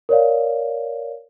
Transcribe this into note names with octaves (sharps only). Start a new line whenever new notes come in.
A#4 C#5 D5 F5